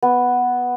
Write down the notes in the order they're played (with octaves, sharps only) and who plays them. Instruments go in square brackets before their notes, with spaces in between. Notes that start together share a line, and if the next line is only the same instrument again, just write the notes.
[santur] B3